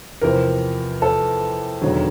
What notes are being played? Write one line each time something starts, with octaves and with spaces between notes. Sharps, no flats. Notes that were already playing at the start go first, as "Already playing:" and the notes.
E2 C3 F3 A#4
A4
E1 D#2 D3 F#3